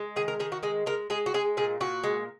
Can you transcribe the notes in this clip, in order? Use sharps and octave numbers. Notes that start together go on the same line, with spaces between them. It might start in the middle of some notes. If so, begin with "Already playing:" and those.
Already playing: G#3
D#3 G#4
A#4
D#3 G#4
F#4
G#3 G#4
G#3 A#4
G#3 G#4
F#4
G#3 G#4
A#2 G#4
A#2 F#4
G#3